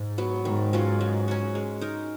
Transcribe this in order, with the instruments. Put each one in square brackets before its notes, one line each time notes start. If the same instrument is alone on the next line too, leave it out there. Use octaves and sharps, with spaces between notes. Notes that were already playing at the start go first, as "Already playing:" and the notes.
Already playing: [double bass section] G#2
[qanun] F#3 B3
[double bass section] G#2 [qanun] D#3
[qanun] F#3 C#4 F4
F#3
C#4 F#4
G#3
D#4 A#4